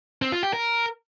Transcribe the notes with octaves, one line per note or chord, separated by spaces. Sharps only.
C4
F4
G4
A#4